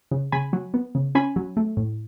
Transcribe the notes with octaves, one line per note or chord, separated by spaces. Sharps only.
C#3
C#3 G#5 B5
F#3
B3
C#3
C#4 G#5 B5
F#3
A3
A2